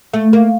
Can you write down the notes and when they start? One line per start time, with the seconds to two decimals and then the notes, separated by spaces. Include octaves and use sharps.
0.14 A3
0.33 A#3